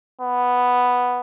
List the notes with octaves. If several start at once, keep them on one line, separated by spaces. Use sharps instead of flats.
B3